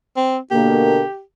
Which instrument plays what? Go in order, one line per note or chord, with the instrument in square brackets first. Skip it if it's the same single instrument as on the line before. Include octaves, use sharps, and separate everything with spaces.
[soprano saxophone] C4
[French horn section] B2 D3 A#3 [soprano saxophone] G4